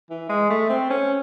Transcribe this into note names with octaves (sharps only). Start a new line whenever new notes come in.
E3
G#3
A3
C4
C#4